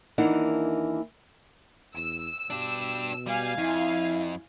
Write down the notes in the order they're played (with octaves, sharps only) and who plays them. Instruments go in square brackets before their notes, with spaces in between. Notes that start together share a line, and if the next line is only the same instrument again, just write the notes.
[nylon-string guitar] D#2 E3 A#3 D4 D#4 F#5
[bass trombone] E2 [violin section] E6
[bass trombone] B2 [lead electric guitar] D4 G4
[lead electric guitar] G3 [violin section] F5 G#5
[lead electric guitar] F2 [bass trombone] E4